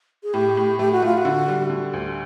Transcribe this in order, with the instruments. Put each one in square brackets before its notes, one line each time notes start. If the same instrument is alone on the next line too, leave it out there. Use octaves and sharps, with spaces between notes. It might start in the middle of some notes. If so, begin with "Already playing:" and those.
[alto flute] G#4
[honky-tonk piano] A2 [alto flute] G4
[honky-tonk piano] A2
[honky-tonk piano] A3 [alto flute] G4
[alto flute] F#4
[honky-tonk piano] A3 [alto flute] F4
[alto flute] F#4
[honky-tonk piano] D3
G3
D3
D2